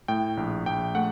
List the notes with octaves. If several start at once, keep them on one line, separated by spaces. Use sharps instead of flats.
A2 G5
A#1
A#1 G5
A3 F#5